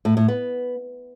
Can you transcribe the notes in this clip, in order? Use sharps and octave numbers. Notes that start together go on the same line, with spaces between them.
A2
A2
B3